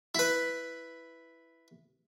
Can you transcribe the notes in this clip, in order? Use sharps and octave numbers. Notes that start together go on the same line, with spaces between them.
E4 B4